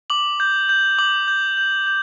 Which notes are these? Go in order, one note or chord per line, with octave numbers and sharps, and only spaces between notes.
D6 F#7
G6
G6
D6 F#7
G6
G6
G6